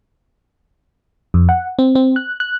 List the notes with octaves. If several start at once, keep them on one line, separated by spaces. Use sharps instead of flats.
F2
F#5
C4
C4
F#6
F#6